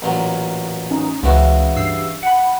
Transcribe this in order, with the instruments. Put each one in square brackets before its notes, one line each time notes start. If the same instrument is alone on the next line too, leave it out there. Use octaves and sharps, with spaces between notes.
[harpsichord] A1 A#2 F#3
[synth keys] C#4 D#4
[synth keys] C#2 [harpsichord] C#3 E3 F#4
[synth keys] G2 E6 C7
F#5 B5